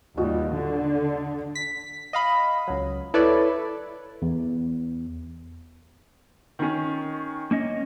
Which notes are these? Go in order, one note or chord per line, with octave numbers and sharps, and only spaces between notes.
D#2 G3 F4 F#4 D#5
D3
B6
D#5 F5 B5
C#2 F#3
E4 A4 B4 C#5 D5
E2
D#3 C#4
A#3 C#4 D#5